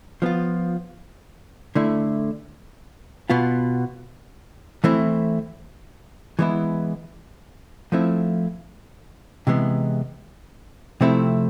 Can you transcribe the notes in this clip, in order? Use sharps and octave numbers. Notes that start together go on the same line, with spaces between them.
F3 B3 F4
D3 A3 E4
B2 B3 F4
E3 A3 C4 E4
E3 G#3 B3 E4
F3 A3 C4 E4
C3 E3 G#3 B3
C3 F3 A3 C4 E4